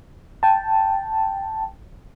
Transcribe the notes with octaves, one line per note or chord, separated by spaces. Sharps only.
G5 A5